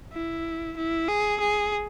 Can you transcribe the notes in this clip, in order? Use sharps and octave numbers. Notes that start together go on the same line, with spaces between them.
E4
E4
G#4
G#4